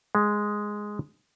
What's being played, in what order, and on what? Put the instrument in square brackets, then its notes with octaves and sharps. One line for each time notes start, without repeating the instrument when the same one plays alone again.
[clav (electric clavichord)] G#3